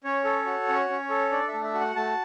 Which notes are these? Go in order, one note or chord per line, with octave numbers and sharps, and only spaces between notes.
C#4 C#5
A4
F#4
C#4
C#4
A4
D4 D5
E5
A3
E5
F#4
F#5
A3 A5